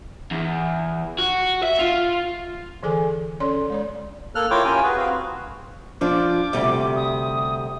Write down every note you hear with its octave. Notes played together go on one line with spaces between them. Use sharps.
E2
F#4
E5
F4
D3 E3 G#4 A4 G#5
C#4 A4 C#5 D5 C6
G#3 C#5 D5
A#3 A4 F6 F#6
E4 F4 A#4 C#5 G5 D6
C#4 E4 F4 G4 A#4 G#5
F#4 G#4 B4
C4 F#4 F5
F3 D4 D6
D2 C3 G3
D#6